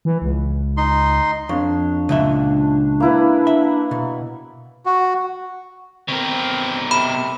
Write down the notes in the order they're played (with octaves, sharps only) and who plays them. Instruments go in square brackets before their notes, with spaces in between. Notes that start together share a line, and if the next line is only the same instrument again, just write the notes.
[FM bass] E3
C#2
[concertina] D#4 C6
[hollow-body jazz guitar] F2 [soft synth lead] D4 [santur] C#5
[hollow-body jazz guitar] C#2 A#2 E5
[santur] A#3 E4 B4
[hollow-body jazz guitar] E5 [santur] F#5
[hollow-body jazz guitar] B2
[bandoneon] F#4
[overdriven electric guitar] B2 A#4 [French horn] C4
[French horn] C3 [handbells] B5